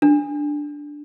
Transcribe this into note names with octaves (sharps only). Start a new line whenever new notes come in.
D4